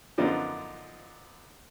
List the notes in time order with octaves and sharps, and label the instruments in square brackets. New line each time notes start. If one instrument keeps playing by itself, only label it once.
[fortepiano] F#2 D3 F3 B3 D4 D#4